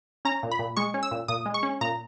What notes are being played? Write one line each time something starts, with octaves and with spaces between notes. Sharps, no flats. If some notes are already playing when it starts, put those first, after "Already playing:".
C#4 A#5
A#2
B5
A#2
G#3 C#6
C#4
E6
A#2
A#2 D#6
G#3
C#6
C#4
A#2 A#5